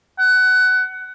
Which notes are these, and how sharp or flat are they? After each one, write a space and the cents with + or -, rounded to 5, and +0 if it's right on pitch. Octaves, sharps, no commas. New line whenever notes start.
F#5 +20